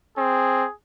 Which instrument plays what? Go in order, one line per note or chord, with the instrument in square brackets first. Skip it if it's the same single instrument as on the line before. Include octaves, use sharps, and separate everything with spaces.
[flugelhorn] C4 [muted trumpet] G#4